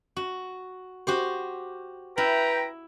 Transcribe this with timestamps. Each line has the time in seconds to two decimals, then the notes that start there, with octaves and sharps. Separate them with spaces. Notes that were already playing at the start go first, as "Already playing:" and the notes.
0.16 F#4
1.07 F#4 G4 C5
2.18 E4 B4 G5 A#5